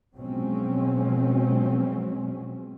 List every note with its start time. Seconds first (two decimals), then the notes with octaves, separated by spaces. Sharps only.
0.15 B2 F3 F#3 G#3 C4 C#4